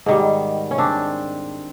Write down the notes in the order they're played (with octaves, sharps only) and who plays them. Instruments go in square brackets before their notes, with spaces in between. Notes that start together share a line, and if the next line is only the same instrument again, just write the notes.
[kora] G#2 D#3 G3
C#4
C4 D4